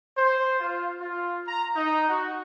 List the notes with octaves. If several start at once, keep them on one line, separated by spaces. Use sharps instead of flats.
C5
F4
F4
A#5
D#4
F#4